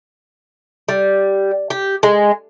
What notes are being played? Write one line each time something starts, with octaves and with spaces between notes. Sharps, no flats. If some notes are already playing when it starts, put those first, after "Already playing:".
G3
G4
G#3